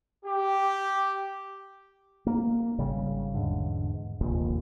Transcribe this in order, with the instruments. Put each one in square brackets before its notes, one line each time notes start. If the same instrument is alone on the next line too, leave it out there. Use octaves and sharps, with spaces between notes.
[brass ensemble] G4
[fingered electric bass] A#3
G#1 C#3 G3
E2 G#2 D3
F1 A#1 D#2 A#2